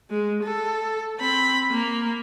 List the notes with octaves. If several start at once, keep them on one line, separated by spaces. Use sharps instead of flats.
G#3
A4
C4 B5
A#3